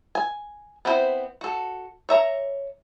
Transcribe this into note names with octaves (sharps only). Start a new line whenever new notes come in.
G#5
B3 C4 D4 E4 C5
F#4 A4
C#5 E5 A#5